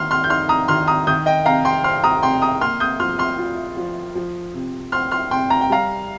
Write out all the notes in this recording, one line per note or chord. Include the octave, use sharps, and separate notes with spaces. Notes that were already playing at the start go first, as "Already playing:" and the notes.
Already playing: D#3 A#3 C6 F6
C6 F6
G6
D#4 C6 F6
A#5 D#6
D#3 C6 F6
A#5 D#6
D#3 D#6 G6
D#5 G5
C3 F5 A#5
G5 C6
C4 C6 F6
A#5 D#6
C3 G5 C6
A#5 D#6
A#3 C6 F6
D#6 G6
F3 C6 F6
C6 F6
F4
F3
F3
C3
C4 C6 F6
C6 F6
C3 G5 C6
A#5
G5
G3 F5 A#5